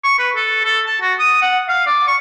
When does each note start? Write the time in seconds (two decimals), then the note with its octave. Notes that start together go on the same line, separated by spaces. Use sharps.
0.04 C#6
0.18 B4
0.36 A4
0.64 A4
0.86 A5
1.01 F#4
1.19 D#6
1.42 F#5
1.68 F5
1.86 D5
2.07 C#6